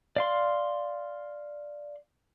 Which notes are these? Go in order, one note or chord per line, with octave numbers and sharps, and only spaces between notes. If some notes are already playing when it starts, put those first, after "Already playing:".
D5 F5 C6